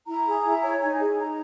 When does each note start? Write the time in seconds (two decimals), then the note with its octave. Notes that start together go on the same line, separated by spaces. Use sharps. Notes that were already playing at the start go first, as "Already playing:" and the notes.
0.07 E4 A#5
0.26 G#4
0.44 E4
0.63 C#5
0.81 D#4 G#5
1.00 G#4
1.18 D#4 A#5